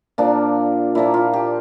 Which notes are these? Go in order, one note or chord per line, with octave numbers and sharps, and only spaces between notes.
A#2 F3 A#3 D4
A#2 F3 A#3 E4
F4
G4